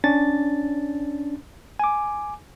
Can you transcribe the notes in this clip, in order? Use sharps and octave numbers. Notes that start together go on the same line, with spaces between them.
C#4 D4 A6
G#5 D6